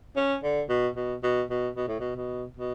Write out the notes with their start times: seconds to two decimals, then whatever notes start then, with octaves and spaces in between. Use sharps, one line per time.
0.16 C#4
0.43 D3
0.69 B2
0.96 B2
1.23 B2
1.50 B2
1.77 B2
1.88 A2
2.00 B2
2.16 B2
2.57 B2